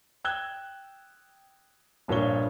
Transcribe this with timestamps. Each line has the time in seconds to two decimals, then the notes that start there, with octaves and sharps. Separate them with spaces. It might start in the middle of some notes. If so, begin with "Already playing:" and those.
0.24 G5 E6 F#6 G#6 G7
2.08 A#1 G2 A#2 D4 C#5 G7